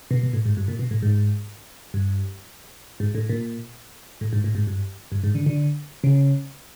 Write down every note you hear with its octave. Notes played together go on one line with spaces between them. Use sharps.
B2
B2
A2
G#2
G2
A#2
B2
A2
G#2
G2
G#2
A2
A#2
A2
G#2
A2
G#2
G2
G2
G#2
D3
D3
C#3